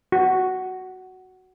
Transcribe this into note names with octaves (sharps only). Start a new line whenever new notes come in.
F#4